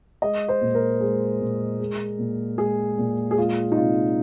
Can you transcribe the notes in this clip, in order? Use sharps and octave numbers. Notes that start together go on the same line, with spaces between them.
G#3 D#5
C5
A#2
A#4
G#3
A#2
G#3
A#2
G#3 G#4
A#2
G#4
G#3 F4
D#4
C3 F4